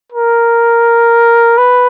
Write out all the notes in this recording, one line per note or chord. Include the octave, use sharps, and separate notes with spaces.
A#4
B4